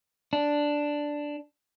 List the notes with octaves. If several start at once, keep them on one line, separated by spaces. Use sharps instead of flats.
D4